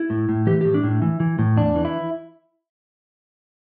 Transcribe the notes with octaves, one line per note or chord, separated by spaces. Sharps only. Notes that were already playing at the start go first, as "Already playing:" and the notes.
Already playing: E4
A2
A2
E3 G4
A2 G4
D4
A2
E3
E3
A2
E2 D4
E3
E4